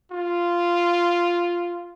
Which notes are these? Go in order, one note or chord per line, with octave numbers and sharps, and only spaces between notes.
F4